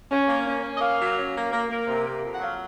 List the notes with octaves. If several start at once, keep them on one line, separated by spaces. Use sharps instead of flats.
C#4
A#3
C#4
C#4
D#5
A#3 F5
F#3
C#4
A#3
A#3
A#3
C3
A#3
F2
F#5
F#3 F5